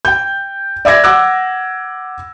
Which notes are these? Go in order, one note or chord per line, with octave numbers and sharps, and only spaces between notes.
G5 G6
D5 E5 D6 G#6 A#6
F#5 D6 E6 F#6